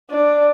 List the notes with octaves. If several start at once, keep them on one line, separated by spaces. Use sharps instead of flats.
D4